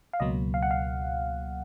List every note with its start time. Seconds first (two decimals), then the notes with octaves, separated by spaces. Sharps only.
0.13 F5
0.20 C#2 B2 F#3 A#3 D#5
0.54 F5
0.62 F#5
0.71 F5